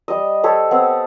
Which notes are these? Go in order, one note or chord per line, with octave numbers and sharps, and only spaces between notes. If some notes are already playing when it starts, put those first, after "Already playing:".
G3 D#5
G4 A4 C5 C#5
B3 C4